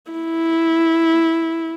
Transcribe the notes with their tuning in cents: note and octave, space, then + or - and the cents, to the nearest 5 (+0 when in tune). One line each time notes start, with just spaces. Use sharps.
E4 -5